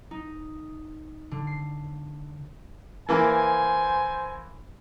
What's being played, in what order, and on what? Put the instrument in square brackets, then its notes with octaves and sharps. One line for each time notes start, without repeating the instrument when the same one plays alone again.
[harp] D#4
D3
C7
[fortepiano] E3 A#3 [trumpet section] C5 G#5